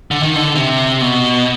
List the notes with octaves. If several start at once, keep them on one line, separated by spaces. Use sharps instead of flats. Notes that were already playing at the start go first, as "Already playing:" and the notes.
D3
D#3
D3
C3
B2